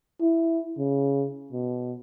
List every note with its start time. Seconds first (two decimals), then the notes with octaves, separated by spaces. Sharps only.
0.21 E4
0.78 C#3
1.52 B2